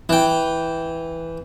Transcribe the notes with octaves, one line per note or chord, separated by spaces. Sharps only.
E3 G5